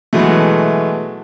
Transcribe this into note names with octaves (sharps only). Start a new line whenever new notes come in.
B2 E3 F#3 G#3 A3